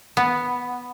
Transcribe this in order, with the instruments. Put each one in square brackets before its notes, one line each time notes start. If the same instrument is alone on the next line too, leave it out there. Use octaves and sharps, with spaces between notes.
[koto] B3